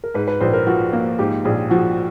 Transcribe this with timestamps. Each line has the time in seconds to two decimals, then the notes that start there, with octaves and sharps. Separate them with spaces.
0.04 A#4
0.14 G#2 B4
0.28 B4
0.41 A#1 C5
0.53 A#4
0.67 F3 F#4
0.93 A#3
1.19 G#2 G4
1.45 A#1 G#4
1.70 F3 F#4